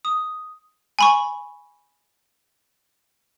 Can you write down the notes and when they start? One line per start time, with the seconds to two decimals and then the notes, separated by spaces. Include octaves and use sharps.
0.05 D#6
0.99 G#5 B5 C#6